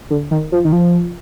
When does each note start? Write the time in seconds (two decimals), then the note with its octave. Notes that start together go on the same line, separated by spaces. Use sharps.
0.10 D3
0.31 D#3
0.52 F3
0.65 D#3
0.72 F3